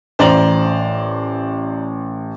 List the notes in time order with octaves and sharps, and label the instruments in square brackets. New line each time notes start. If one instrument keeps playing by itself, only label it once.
[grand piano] A1 F#7 [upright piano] C5 D5 A#5